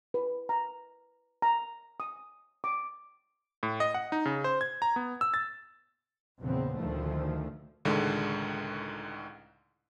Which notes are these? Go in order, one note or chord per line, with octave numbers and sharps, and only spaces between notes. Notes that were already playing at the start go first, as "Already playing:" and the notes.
B4
A#5
A#5
D#6
D6
A2
D#5
F#5
D#4
C#3
C5
G#6
A#5
B3
E6
A6
A#1 E2 C#3 B3 C4
D2 D#3 F3 A3
C#2 A2 D3 D#3 G#3